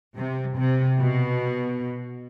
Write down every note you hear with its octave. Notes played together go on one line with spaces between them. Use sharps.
C3
C3
B2